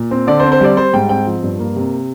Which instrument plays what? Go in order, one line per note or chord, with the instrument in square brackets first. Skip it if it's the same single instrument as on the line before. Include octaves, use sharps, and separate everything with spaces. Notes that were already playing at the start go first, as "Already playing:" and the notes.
Already playing: [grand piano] A#2
C4
D3 D5
C5
C4
C5
G3 D5
G3 C5
G#2 G5
C4 G5
F3
G2
A#3
C3